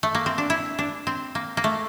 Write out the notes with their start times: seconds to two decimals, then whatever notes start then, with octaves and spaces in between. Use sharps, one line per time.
0.03 A3
0.15 A#3
0.26 C4
0.38 D4
0.50 E4
0.79 D4
1.07 C4
1.35 A#3
1.57 A#3
1.64 A3